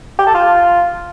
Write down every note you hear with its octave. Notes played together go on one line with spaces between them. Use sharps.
G4
A4
F4